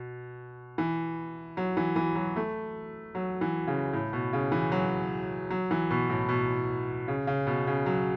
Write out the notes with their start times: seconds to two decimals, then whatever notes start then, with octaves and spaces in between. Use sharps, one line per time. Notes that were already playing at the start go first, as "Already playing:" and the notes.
Already playing: B2
0.78 E3
1.57 F#3
1.77 E3
1.96 E3
2.15 F#3
2.36 A3
3.15 F#3
3.41 E3
3.67 C#3
3.93 A2
4.13 B2
4.33 C#3
4.52 E3
4.72 F#3
5.50 F#3
5.71 E3
5.90 B2
6.09 A2
6.29 B2
7.08 C#3
7.27 C#3
7.47 B2
7.67 C#3
7.86 F#3